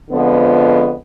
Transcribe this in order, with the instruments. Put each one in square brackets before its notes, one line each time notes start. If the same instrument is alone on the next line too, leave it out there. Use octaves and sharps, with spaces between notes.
[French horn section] F2 D3 F3 G#3 B3